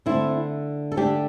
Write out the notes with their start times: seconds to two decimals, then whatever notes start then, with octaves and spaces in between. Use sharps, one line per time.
0.06 D3 A3 C4 E4
0.92 A4
0.97 D3 A3 D4 G4